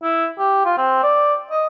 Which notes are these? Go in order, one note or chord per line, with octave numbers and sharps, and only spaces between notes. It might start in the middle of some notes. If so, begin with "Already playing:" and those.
E4
G4
F4
C4
D5
D#5